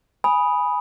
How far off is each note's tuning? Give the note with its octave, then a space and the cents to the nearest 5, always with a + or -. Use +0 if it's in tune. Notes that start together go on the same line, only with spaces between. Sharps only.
G#5 +0 B5 -5 D#6 +0